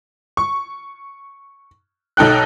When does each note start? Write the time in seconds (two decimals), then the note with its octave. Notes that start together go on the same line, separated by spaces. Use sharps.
0.37 C#6
2.17 B1 D#4 A4 G5 F#6